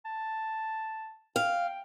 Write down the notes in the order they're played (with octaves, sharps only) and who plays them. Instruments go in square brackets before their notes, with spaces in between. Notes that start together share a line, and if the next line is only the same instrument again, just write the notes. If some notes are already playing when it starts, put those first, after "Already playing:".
[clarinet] A5
[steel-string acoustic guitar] F5 [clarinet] G5